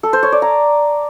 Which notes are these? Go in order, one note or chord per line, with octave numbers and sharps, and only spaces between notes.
A4
C5
C#5
D5
A#5